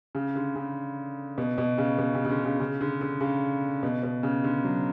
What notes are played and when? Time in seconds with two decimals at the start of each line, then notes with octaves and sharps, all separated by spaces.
0.15 C#3
0.36 D3
0.56 C#3
1.38 B2
1.58 B2
1.78 C#3
1.99 B2
2.14 C#3
2.25 C#3
2.29 D3
2.45 C#3
2.60 C#3
2.81 D3
3.01 D3
3.21 C#3
3.83 B2
4.03 B2
4.23 C#3
4.44 D3
4.64 F#3